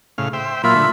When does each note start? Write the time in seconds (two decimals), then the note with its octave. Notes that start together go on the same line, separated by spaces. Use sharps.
0.18 A2 C#3 F5
0.33 C5 E5 G5
0.64 A#2 F#3 A#3 F4 E5 B5
0.75 D3 A3